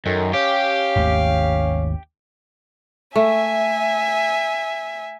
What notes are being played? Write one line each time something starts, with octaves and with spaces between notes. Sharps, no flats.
F#2 D#3 A4
C#4 G4 F5
G#1 D#2 A3
A3 E5 G#5